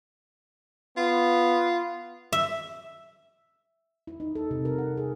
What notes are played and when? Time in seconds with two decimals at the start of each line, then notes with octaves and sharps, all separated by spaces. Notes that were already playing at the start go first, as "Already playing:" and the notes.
0.97 B3 F4
2.32 E5
4.07 E4
4.20 D#4
4.35 A4
4.51 C3
4.65 A#4
4.78 F#5
4.97 G#4